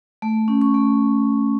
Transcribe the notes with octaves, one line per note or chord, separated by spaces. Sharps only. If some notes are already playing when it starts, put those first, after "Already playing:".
A3
C#4
C#6
A3